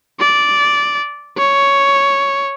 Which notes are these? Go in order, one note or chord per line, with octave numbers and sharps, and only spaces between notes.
D5
C#5